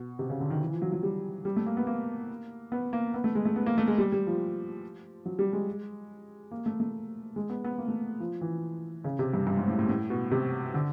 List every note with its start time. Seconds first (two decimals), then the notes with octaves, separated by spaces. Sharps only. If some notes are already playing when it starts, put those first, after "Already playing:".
Already playing: B2
0.19 C3
0.30 C#3
0.40 D3
0.50 D#3
0.61 E3
0.72 F3
0.82 F#3
0.92 F#3
1.03 G3
1.45 G3
1.56 A3
1.66 A#3
1.77 B3
1.87 A#3
2.72 B3
2.93 A#3
3.14 B3
3.24 A3
3.35 G#3
3.45 A3
3.56 B3
3.66 A#3
3.78 A3
3.88 G#3
3.98 G3
4.12 G3
4.27 F3
5.26 F#3
5.39 G3
5.53 G#3
6.51 A#3
6.66 A3
6.80 A3
7.36 G#3
7.50 B3
7.64 B3
7.78 A#3
7.88 A3
8.20 F3
8.41 E3
9.04 C#3
9.19 C3
9.34 G2
9.47 G2
9.58 G#2
9.68 A2
9.79 A2
9.89 A2
10.10 B2
10.31 C3
10.74 D3